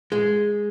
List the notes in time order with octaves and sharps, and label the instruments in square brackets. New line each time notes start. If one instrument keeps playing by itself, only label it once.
[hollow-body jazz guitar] G#3